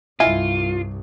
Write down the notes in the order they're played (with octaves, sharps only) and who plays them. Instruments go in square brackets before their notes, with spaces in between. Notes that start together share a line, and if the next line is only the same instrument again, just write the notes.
[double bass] C2 G2 [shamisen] E4 D#5 G#5 [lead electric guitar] F4